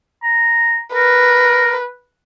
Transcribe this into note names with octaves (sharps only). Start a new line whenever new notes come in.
A#5
A#4 B4